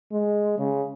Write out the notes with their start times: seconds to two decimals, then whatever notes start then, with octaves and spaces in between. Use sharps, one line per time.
0.12 G#3
0.58 C#3